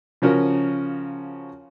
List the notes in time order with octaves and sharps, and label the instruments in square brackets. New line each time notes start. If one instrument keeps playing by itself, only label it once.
[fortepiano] C#3 F3 C#4 F#4 A#4